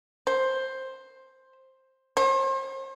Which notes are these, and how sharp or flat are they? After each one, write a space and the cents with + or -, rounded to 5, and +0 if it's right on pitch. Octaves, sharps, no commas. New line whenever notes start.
C5 +10
C5 +40